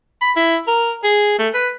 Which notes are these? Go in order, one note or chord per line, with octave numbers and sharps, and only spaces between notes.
B5
E4
A#4
G#4
A3
B4